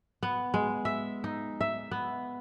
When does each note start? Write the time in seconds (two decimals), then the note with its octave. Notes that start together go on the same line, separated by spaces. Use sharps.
0.23 B3
0.54 G#3
0.85 E5
1.24 D#4
1.61 E5
1.91 B3